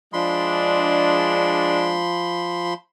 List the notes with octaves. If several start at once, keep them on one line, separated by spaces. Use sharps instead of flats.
F3 G#3 D4 B5 C6